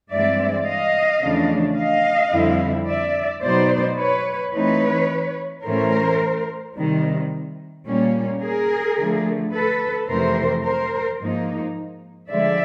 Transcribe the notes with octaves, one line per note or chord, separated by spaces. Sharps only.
G2 E3 G#3 C4 D5 E5
D#5 F5
E2 C#3 F3 A3 D4
D#5 F5
F2 D3 G3 C4 E4
D5 E5
B2 F#3 B3 D#4 C5 D5
B4 C#5
E3 A3 C4 D#4 B4 C#5
A2 E3 A3 C#4 A#4 C5
C3 D#3 G3
A#2 G3 A#3 C#4
G#4 A#4
D3 F3 A3
A4 B4
F2 C3 E3 A3 A#4 C5
A#4 C5
G#2 F3 A#3 D#4
D3 F3 G#3 D5 E5